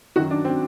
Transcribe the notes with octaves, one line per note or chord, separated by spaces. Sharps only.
F#2 D#3 F#3 F#4
D4
C4